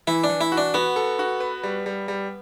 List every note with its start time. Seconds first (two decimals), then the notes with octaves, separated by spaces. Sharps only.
0.07 E3 E4
0.24 D4
0.29 E3
0.41 E4
0.52 F#4
0.57 D4
0.74 B3 F#4
0.96 A4
1.19 F#4
1.40 B4
1.63 G3
1.86 G3
2.08 G3